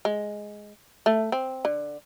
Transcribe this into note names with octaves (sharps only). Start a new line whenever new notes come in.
G#3
A3
C4
D3